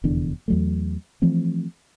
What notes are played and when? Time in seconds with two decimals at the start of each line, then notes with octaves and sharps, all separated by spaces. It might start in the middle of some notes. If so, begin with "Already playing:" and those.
0.04 F1 E2 D3 D4
0.48 E2 F#3 A3
1.22 E3 F3 A3 C4